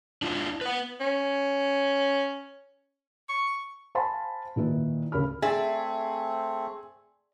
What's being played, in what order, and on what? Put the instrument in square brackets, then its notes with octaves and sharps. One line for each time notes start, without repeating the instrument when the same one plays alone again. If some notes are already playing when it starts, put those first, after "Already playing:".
[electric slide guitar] D4 E4 F4
B4 F#5
[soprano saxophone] C#4
C#6
[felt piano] C5 F5 G#5 A5 B5 C6
A#2 D#3 E4 B4
D2 C#3 A#4 B5 F6
[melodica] A3 C4 [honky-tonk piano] G#4 [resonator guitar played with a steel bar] D5 E5